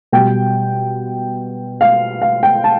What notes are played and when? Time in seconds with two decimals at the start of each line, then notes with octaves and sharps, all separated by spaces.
0.12 B2 G3 G5
1.81 F5
2.22 F5
2.43 G5
2.64 A5